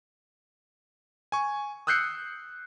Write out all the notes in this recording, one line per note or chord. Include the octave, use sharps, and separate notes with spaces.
G#5 C#6
D#6 E6 F#6 G6 C7 C#7